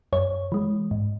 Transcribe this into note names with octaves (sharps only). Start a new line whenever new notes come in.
F#2 C#5
E3 G#3
G#2